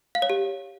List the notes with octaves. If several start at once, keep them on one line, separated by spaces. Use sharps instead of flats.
F5
C#5
G4